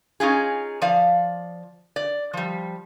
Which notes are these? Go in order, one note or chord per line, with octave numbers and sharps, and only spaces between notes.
C#4 D#4 F4 G#4
F3 D5 F5
D5
F3 G3